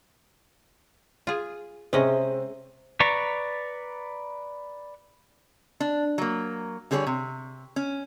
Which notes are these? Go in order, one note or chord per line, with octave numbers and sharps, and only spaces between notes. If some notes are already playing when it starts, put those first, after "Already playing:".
F4 G#4
C3 G#3 C4 C#4 D#5
B4 D5 A#5 C#6
D4
F#3 A#3
D3 G3 G#4 B4 C#5
C3
C#4